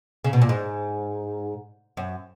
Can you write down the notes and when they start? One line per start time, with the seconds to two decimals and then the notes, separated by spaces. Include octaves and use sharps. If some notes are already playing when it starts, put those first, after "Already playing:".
0.24 C#3
0.33 B2
0.42 A#2
0.49 G#2
1.97 F#2